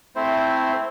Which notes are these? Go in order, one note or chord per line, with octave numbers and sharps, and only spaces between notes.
A3 C4 E4 C5